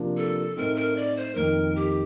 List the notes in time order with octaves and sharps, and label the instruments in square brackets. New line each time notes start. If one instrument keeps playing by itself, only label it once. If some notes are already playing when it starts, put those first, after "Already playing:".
Already playing: [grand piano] C3 F3 A#3 D4
[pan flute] A4
[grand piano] A2 A3 C4 D#4 [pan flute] A#4
[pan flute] A#4
D5
C5
[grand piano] F2 D#3 A#3 D#4 [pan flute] A#4
[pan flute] G4